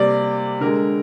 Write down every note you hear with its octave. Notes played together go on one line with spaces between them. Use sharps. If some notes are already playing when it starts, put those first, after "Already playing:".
Already playing: C3 G3 A#3 D5
D3 G#3 A#4